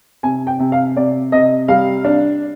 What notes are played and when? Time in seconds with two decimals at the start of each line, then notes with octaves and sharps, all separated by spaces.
0.23 C3 G#5
0.47 G5
0.59 C3
0.72 F5
0.96 C3 D5
1.32 C3 D#5
1.68 G3 F5
2.05 D4